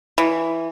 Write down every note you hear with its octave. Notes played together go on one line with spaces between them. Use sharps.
E3